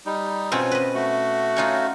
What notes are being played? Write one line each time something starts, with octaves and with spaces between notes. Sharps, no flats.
G3 D#4
B2 C4 C#4 F4
B4 D#5
A3 F#4
C#4 D#4 F4